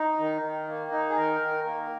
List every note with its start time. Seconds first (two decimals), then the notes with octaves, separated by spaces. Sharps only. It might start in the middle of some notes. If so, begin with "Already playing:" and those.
Already playing: D#4
0.18 D#3
0.42 D#3
0.68 A#3
0.91 D#4
1.09 G#4
1.16 D#3 A#4
1.41 D#3
1.66 A#3